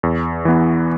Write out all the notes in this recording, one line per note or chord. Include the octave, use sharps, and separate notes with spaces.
E2
E3 B3